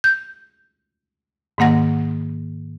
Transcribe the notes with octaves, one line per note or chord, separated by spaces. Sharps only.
G6
G#2 D#3 A#3 F#5 A#6